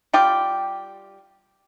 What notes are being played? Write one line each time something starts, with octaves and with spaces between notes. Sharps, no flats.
G3 F4 G4